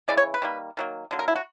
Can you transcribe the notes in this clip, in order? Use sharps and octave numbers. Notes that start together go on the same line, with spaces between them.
C#3 E3 G#3 D5
C#5
B4
D#3 G3 A#3
D#3 F#3 A#3
D3 F#3 A#3
A#4
E4
F#4